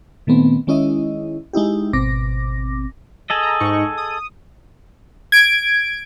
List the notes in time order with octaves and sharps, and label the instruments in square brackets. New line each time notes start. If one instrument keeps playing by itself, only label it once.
[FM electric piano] A#2 D#3 A3 B3 C4
D#3 G#3 C#4 E4 D#5
G#3 D#4 E4 G4
G#1 B2 C4 D6 A#6
[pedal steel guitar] G#4 A4 D#5
[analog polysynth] A#5
G#2 D#4 C#6
D#6
[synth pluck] G#6 D7